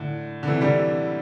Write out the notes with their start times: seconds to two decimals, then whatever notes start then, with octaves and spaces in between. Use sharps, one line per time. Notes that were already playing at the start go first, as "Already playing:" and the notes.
Already playing: A2 D3
0.43 D3
0.47 C3 E3
0.61 D3 G3